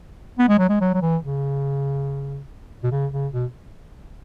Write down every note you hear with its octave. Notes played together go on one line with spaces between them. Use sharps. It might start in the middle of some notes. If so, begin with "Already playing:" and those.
B3
G#3
F#3
G#3
F#3
F#3
E3
C#3
B2
C#3
C#3
B2